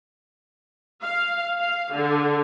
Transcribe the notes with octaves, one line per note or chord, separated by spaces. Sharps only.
F5
F5
D3